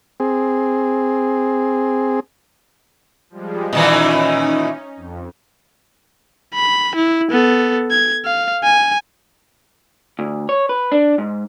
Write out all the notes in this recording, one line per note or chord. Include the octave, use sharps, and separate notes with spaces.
C4 G#4
F3 G3 G#3
A#2 D#3 E3 C#4 D#4
F2
B5
E4
B3 A4
G#6
F5
G#5
D2
C#5
B4
D4
G#2